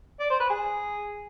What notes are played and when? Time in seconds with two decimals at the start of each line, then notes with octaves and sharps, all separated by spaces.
0.20 D5
0.30 C5
0.40 B4
0.50 G#4